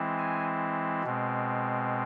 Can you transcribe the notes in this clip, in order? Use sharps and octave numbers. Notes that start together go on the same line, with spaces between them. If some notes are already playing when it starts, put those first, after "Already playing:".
Already playing: E3 G#3 C4 E4
G#5
B2 G#3 C4